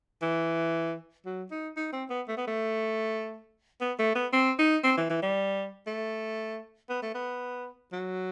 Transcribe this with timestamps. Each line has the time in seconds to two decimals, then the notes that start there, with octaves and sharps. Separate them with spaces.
0.22 E3
1.25 F#3
1.51 D#4
1.76 D#4
1.93 C4
2.10 B3
2.28 A3
2.37 B3
2.47 A3
3.81 B3
3.99 A3
4.15 B3
4.33 C4
4.59 D#4
4.84 C4
4.97 E3
5.10 E3
5.22 G3
5.87 A3
6.89 B3
7.02 A3
7.14 B3
7.93 F#3